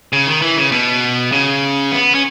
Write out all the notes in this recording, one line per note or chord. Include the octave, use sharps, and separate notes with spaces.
C#3
D#3
E3
C#3
B2
C#3
B3
C#4